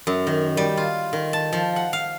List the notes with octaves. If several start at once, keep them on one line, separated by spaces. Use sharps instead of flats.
F#2
D#3
G3
F4
D#3
A5
F3
F#5
F5